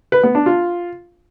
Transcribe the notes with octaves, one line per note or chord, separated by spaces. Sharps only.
B4
B3
D4
F4